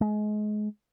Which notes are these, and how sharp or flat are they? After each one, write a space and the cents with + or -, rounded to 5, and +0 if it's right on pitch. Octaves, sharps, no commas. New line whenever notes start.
G#3 +30